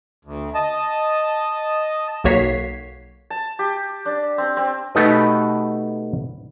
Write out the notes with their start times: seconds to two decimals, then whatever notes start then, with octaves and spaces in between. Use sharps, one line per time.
0.25 D2
0.55 D#5 A5
2.24 B1 A#3 F#4 C#5 B6 C7
3.30 A5
3.59 G4
4.06 D4
4.38 C4
4.57 C4
4.95 B2 A3 B3 D#4 G4 B4